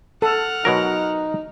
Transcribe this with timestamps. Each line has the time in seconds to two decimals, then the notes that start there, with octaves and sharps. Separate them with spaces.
0.22 A4 F#5 F6
0.65 B2 F#3 D#4 A#4